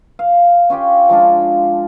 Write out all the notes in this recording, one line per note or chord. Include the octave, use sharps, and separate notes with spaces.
F5
C#4 F4 G4 G5
F3 G#3 D4 F4